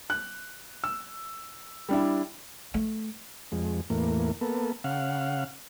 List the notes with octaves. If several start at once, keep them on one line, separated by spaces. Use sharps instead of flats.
F#6
E6
G3 D4 E4
A3
F2 G#3
E2 A2 A#3
A#3 B3 A4
C#3 F5 F#5